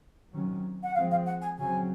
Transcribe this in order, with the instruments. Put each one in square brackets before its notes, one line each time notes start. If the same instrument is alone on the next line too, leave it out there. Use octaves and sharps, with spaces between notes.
[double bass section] C3 D#3 F#3 C#4
[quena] F#5
[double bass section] F3 G#3 C4 [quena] F5
[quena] F5
F#5
G#5
[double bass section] C#3 F#3 C4 [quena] G#5